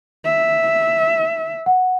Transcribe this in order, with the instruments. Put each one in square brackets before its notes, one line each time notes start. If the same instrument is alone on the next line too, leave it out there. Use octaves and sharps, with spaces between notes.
[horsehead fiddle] E5
[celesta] F#5